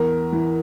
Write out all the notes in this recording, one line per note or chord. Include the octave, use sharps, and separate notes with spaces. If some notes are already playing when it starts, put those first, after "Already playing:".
Already playing: E2 A#4
E3